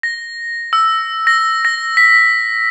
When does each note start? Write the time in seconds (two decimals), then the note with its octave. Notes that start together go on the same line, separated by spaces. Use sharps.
0.03 A#6
0.73 E6
1.27 A#6
1.65 A#6
1.97 B6